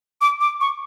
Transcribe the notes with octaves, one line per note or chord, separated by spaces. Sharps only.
D6
D6
C#6